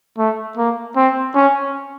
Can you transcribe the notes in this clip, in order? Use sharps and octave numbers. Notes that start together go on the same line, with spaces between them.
A3
A#3
C4
C#4